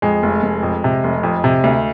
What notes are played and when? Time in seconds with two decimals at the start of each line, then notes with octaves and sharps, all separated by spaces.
0.02 F2 G#3
0.23 F1
0.43 F1
0.63 F2
0.84 C3
1.04 F1
1.23 F2
1.44 C3
1.64 D2